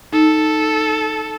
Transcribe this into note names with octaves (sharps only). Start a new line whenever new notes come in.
D#4 A4